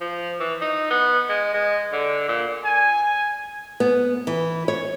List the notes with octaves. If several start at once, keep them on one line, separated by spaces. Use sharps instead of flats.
F3
E3
D#4
B3
G#3
G#3
D3
A#2
G#5
B3
E3
C#5